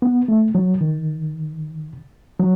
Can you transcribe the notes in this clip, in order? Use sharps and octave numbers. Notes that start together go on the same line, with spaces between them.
B3
A3
F#3
D#3
F#3